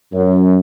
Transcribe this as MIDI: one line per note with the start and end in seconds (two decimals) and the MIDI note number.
0.14 0.59 42